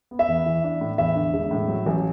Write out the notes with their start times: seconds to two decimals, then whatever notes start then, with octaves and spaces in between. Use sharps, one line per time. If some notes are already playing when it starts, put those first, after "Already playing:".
0.11 B3
0.19 E5
0.28 E2
0.46 E3
0.64 D4
0.81 A2
0.98 E2 E5
1.15 D3
1.33 E1
1.51 A2
1.68 F#3
1.86 A1